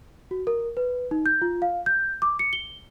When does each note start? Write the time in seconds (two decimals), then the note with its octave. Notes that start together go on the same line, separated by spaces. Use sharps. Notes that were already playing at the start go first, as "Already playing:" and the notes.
0.31 F#4
0.47 A#4
0.77 B4
1.11 D#4
1.26 G6
1.42 F4
1.62 F5
1.86 G6
2.22 D6
2.39 C#7
2.53 G7